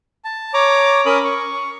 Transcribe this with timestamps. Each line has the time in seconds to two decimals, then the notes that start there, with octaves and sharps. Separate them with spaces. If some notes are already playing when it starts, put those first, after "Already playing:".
0.24 A5
0.54 C#5 A#5 D6
1.06 C#4 A#4 B5 D#6
1.24 C#6